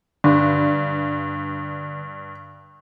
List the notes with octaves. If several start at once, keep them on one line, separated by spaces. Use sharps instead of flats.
G2 D3